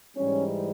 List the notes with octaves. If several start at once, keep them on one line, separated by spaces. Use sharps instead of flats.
G#2 E3 G3 C#4